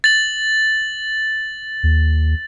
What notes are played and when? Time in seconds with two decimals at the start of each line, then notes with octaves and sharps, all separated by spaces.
0.04 A6 F#7
1.83 D#2